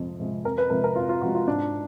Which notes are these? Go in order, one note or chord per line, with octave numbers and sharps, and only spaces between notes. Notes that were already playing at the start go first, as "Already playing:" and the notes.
Already playing: F2 C3 F3 G#3
C3 F3 G#3
F2 A#4
B4
C3 F3 G#3 A#4
A#4
F2 F4
F4
C3 F3 G#3 F#4
F4
G#2 D4